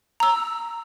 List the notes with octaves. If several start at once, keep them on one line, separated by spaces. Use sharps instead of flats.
A#5 E6